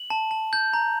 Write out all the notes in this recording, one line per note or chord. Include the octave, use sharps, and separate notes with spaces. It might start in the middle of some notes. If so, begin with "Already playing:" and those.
Already playing: F#7
A5
A5
G6
A#5